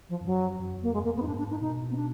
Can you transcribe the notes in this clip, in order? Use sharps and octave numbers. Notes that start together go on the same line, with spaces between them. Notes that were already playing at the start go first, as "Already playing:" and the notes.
F3
F2
F#2 F#3
F#2
F2
A#3
F#2 G#3
F2 A#3
F#2 B3
D#4
G#2 D4
D4
D#4
B2 D#4
B3
D4